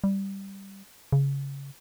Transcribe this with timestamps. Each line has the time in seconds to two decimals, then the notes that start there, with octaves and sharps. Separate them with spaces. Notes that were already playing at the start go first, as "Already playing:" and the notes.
0.04 G3
1.12 C#3